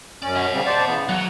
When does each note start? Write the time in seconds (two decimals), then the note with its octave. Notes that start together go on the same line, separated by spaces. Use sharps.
0.22 F#2 C#4 D5
0.36 D#5 F#5
0.53 C#3 G3 C4
0.66 C5 D5 A5
0.87 C#3 E3 B3
1.09 F#3 F#5